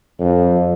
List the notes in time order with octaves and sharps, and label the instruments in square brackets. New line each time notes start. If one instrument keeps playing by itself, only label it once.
[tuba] F2